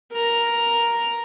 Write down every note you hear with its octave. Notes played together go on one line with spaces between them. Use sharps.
A#4 A#5